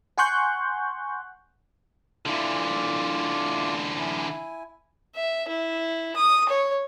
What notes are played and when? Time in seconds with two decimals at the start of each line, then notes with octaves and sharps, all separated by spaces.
0.18 F#5 G#5 C6 C#6 F#6 G6
2.26 D3 E3 F4 D5
3.98 E4 G#5
5.15 E5
5.48 E4
6.16 D#6
6.49 C#5